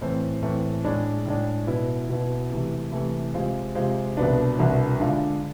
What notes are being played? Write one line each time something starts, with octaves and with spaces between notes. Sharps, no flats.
A2 E3 A3 C4
A2 E3 A3 C4
A2 G#3 D4
A2 G#3 D4
B2 B3 E4
B2 B3 E4
C3 E3 A3 E4
C3 E3 A3 E4
C3 G#3 C4 F4
C3 G#3 C4 F4
C2 B2 B3 D4
C2 B2 B3 D4
D3 G#3 D4 F4